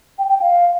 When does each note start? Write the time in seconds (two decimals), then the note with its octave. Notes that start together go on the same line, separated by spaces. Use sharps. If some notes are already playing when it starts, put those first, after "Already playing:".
0.18 G5
0.29 G5
0.41 F5